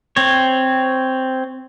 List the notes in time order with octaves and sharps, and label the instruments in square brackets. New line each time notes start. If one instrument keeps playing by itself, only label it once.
[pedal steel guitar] C4 C#5